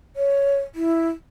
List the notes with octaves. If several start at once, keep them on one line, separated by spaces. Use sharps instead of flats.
C#5
E4